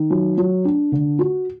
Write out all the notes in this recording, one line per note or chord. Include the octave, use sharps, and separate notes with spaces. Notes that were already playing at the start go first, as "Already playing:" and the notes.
Already playing: D#3
F#3
F#3
D4
D3
F#4